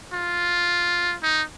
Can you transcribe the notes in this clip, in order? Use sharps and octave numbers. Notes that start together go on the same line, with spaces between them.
F4
D#4